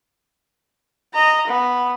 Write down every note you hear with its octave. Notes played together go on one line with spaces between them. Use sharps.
D#5 A#5
B3